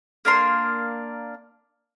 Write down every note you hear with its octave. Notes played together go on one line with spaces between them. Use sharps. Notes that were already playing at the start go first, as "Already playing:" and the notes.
A#3 D4 A#4 C6